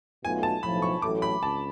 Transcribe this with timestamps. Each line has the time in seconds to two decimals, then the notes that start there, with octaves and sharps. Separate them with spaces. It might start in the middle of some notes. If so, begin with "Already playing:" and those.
0.25 B1 B2 A3 F4 G#5
0.43 A5
0.63 B1 A2 F3 B5
0.82 C#6
1.02 A1 A2 F#3 A3 D6
1.22 B5
1.41 C#2 A5